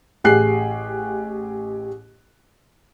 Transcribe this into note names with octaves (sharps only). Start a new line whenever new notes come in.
A1 G4 G#4 G#5 F#6 C7